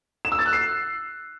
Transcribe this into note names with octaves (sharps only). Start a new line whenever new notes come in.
E7
E6
A6
F#6
C7